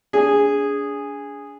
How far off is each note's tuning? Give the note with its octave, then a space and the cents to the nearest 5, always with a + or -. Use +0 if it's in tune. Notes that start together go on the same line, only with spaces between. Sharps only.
D4 -35 G#4 -10